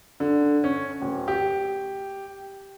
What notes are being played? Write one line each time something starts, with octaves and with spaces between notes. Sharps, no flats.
D3
C#4
D1
G4